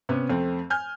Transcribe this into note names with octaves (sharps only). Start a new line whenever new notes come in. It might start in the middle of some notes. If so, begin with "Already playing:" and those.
C3 B3 C#4
F2 A3 C4
G#5 F6 G6